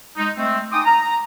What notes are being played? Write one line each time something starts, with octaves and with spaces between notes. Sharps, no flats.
G#3 D#4
G#3 A3 C4
D#4 G5 G#5 C6 D6 D#6
A#5